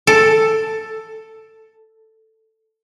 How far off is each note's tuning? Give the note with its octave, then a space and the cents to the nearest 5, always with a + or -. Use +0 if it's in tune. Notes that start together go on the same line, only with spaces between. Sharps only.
A4 +5